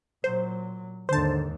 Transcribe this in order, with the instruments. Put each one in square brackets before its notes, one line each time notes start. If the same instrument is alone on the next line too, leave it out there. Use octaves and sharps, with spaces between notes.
[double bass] A#2 F#3 [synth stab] C5
[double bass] D#2 G#2 [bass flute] D3 [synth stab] C5 A5